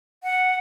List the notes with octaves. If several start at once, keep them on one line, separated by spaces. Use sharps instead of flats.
F#5